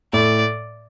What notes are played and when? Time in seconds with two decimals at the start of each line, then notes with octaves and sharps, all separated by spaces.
0.13 A2 D5